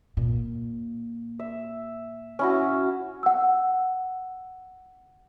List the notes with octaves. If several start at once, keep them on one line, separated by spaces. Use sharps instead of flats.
A#2
E5
C#4 E4 F#4
F#5 E6